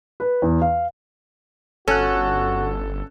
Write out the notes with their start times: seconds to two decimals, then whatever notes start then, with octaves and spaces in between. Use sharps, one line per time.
0.20 B4
0.42 E2
0.62 F5
1.88 G1 C#4 F#4 A4 F#6